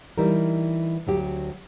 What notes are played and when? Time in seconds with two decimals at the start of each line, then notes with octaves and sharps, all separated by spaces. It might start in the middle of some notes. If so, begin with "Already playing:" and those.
0.18 E3 G3 D#4 A#4
1.07 D2 F#3 G4